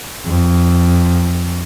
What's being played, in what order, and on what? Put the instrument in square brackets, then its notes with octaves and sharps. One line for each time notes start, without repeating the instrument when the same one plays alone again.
[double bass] F2